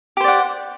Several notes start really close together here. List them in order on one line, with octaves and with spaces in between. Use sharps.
G4 C5 D5 F#5